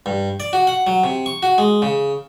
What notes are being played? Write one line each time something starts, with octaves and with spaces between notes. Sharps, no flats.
G2
D5
F#4
F#5
F#3
C3
C#6
F#4
G#3
C#3